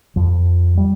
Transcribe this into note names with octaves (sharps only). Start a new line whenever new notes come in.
F2 F3
G3